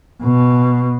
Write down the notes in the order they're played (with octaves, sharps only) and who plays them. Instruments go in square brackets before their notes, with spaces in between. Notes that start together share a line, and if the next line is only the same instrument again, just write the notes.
[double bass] B2